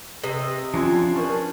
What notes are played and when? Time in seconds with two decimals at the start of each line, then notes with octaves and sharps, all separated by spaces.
0.24 C3 B4 D#5
0.74 F3 C#4 D4 F4 G#5 C6
1.16 C#4 D4 A#4 B4 C#6